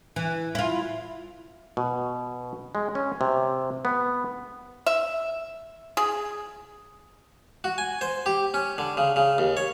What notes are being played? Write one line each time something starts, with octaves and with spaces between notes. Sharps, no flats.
E3
E4 F4
B2
G#3
C#4
C3
B3
E5
G#4
F#4
G#5
C5
G4
C#4
D3
C#3
C#3
D#2
C#5